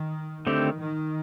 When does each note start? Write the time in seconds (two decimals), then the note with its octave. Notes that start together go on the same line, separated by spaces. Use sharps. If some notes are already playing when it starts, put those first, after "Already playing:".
Already playing: D#3
0.47 D3 D#3 A3 C4 G4
0.79 D#3